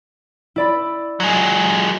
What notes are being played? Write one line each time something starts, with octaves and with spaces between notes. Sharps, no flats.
E4 D5 B5
F#3 G#3